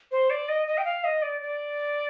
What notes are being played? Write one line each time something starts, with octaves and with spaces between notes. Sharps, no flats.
C5
D5
D#5
D#5
G5
F5
D#5
D5
D5